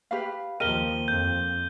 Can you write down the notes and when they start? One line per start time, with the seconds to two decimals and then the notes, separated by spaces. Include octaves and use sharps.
0.11 G4 B4 F5
0.60 D#2 F3 G4 A#4 D#5 D#7 G7
1.08 F2 G6